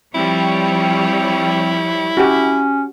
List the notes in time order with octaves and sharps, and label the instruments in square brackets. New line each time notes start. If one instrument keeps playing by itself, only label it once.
[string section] F3 G3 C#5 [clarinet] C4 [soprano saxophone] E4
[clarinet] C#4 [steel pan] F#4 G4